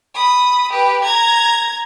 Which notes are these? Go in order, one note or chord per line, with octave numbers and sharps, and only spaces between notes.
B5 D#6
G4 B4
A#5 G#6